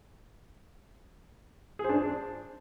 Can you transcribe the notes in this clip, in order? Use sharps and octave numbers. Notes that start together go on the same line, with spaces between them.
G#4
C5
D4